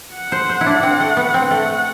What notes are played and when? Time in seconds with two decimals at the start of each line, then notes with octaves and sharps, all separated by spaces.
0.14 F#5
0.32 C5
0.49 C5
0.61 E4
0.66 D4
0.83 C4
1.00 A3
1.17 B3
1.34 C4
1.51 A3 F#5